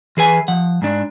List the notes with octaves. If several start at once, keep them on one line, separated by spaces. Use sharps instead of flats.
E3 G#4 B4 G#5
F3 F#5
G#2 D4